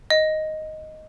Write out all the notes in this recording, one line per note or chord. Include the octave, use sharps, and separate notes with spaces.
D#5